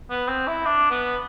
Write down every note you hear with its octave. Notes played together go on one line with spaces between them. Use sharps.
B3
C4
E4
D4
B3